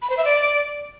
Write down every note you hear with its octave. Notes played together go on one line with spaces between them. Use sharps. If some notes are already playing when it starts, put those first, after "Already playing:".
B5
C5
E5
D5